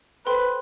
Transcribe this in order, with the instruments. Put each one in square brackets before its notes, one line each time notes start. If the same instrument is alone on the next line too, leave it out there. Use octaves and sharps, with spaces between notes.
[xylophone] A4 C5 G5 C6 [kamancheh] B4